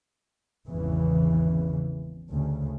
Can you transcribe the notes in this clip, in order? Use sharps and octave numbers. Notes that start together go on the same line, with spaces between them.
G#1 E2 C#3 E3
D2 C#3